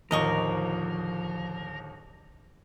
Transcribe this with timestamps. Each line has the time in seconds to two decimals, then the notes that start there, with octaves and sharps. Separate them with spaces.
0.11 D1 D#2 F3 A#4 D5 D#5 C#6 D#6